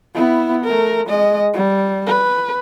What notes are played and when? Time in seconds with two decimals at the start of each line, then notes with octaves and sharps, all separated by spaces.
0.14 B3 E4
0.65 A3 A#4
1.07 G#3 D#5
1.54 G3
2.06 B4